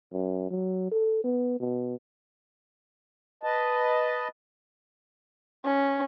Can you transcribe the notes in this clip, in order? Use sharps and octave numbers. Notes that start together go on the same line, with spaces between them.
F#2
F#3
A4
B3
B2
B4 D#5 A5
C#4